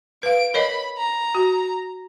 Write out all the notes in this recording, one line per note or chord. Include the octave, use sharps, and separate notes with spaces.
B4 F5 D7
A#4 C#5 D#5 B5
A#5
F#4